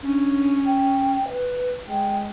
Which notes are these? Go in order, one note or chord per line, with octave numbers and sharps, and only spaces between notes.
C#4 D4
G5
B4
G#3 G5